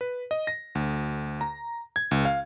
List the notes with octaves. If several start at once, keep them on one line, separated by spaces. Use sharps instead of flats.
B4
D#5
A#6
D2
A#5
G#6
C#2
F5